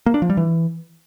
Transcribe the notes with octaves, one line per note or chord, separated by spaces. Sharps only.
A#3
D4
F3
G3
E3